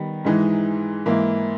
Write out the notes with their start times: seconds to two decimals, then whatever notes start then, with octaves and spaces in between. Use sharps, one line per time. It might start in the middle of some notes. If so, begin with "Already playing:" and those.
Already playing: D#3 G3 B3
0.24 G#2 E3 G#3 D#4
1.06 G#2 E3 A#3 E4